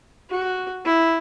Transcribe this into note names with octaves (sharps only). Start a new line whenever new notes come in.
F#4
E4